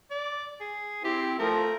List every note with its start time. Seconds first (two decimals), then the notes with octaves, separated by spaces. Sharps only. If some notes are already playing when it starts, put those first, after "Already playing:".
0.11 D5
0.61 G#4
1.04 C4 E4 G4
1.39 F3 A3 A#4